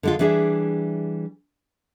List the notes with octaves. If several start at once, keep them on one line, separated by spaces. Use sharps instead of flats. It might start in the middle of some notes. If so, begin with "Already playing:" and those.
D3 G#3 F4
E3 G3 D4 G#4 E5